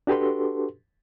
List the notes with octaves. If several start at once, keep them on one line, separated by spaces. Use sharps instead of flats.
D4 F#4 G4 A4 B4 C6